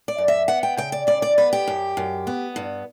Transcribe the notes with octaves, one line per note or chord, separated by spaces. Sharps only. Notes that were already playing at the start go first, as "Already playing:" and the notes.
D5
F#2
E5
B3 F#5
G5
C#3 G5
D5
C#3 D5
D5
B3 B4
G4
F#2
F#2
B3
G2